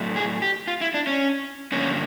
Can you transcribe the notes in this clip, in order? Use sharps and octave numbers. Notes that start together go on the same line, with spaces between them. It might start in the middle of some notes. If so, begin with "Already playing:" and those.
Already playing: A2 F#3 A3
G#4
G4
F4
E4
D4
C#4
G2 D3 F3 A#3 C#4